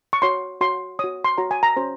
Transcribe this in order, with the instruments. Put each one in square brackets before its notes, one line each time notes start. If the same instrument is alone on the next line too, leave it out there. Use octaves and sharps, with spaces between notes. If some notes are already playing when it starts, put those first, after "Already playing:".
[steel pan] C#6
F#4 C#5 C6
F#4 C#5 C6
F#4 C#5 D#6
C6
F#4 C#5 A#5
G#5
A#5
C#4 F#4 C5